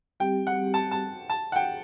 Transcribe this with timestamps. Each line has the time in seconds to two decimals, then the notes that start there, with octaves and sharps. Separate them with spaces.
0.20 G3 C4 G4 G5
0.47 F#5
0.74 A5
0.91 A5
1.30 A5
1.52 F#5
1.56 G5